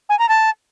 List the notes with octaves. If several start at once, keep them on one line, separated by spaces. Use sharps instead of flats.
G#5
A#5
A5